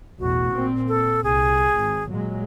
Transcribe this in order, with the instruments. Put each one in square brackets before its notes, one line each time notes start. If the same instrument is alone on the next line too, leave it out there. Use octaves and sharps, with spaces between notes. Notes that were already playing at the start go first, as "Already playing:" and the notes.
[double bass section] A1 E2 B2 [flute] F#4
[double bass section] A#2 C4
[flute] A4
[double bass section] C2 [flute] G#4
[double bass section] G#1
A#2 F#3 G#3